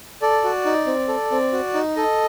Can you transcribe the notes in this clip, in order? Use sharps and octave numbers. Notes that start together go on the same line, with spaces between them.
A4 D5
F#4
D#4
C4
A4
C4
F#4
D#4
A4 D#5